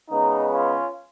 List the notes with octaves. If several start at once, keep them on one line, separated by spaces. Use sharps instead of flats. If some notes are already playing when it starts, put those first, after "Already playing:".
C#3 G#3 B3 D#4
C#4 F4